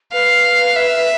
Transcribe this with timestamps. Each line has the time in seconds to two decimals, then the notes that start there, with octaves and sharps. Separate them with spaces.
0.13 B4 F5
0.76 E5